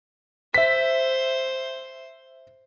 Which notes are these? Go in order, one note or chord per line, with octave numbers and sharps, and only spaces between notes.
C5 E5 B6